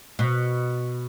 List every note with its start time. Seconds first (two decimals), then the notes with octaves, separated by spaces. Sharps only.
0.19 B2